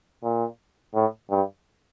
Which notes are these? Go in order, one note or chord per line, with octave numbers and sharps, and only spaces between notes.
A#2
A2
G2